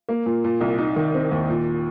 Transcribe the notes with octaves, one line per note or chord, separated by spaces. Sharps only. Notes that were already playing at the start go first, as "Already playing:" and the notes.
A#3
A#2
A#2
C2
D#4
D#3
C4
D#2
A#2